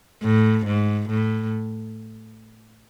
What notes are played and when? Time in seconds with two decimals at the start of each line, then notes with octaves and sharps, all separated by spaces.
0.23 A2
0.66 G#2
1.09 A2